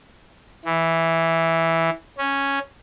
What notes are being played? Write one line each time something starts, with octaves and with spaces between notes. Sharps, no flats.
E3
C#4